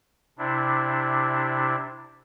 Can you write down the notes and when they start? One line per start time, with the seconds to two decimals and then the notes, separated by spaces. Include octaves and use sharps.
0.38 C3 D4 E4